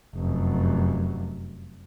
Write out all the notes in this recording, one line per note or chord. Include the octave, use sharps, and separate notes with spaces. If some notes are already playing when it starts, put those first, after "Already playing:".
F1 F#2